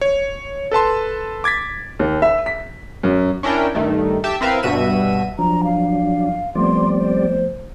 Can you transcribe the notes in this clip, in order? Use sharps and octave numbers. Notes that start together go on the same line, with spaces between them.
C#5
A4 B4 A5 C6
D6 G#6 A6 B6
D#2
E5
B6
F#2
C#4 D4 E4 A#4 G5
G2 D#3 A3
G4 E5 A5
C4 E4 A#4 B4 E5 F5
G2 B2 F#4 E5 D#7
F3 F#3 D4 A#5
F5
F3 G3 A3 B3 C4 D5 C6
C5